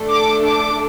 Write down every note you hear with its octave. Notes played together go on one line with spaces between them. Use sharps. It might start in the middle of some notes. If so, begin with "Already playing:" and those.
Already playing: A3 D4 A4
D6
D6